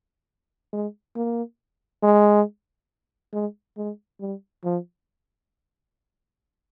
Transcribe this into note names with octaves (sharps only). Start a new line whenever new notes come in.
G#3
A#3
G#3
G#3
G#3
G3
F3